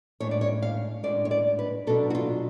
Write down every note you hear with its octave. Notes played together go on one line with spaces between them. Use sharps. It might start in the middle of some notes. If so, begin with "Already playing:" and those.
A2 G#3 D4 C#5
D5
C#5
F5
A2 G#3 D4 D5
C#5
D5
B4
B2 F#3 B3 D4 A4
F#4
F4